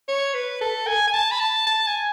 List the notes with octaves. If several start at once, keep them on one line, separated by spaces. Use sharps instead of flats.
C#5
B4
A4
G#5
G#5
A5
B5
A5
A5
G#5